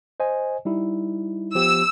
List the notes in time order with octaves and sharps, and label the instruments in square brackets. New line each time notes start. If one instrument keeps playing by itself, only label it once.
[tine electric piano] C5 D#5 G#5
G3 D#4 E4
[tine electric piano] F3 B3 G4 [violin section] E6